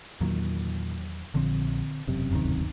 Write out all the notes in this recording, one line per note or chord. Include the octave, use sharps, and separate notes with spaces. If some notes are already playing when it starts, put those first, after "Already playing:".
E2 A#2 D#3 F#3
A#1 D3 C4
E1 F#2 C3
G1 D2 D#3